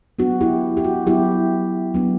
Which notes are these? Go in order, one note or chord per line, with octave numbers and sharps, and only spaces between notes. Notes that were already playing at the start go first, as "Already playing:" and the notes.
F#3 B3 D4 F#4
E4 G4
G4
F#4
F#3 B3 D4 E4 G4
F#3 B3 D4